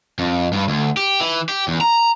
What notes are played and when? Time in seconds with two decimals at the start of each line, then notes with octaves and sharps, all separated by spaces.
0.19 F2
0.53 G2
0.68 D2
0.97 G4
1.21 E3
1.49 G4
1.68 E2
1.81 A#5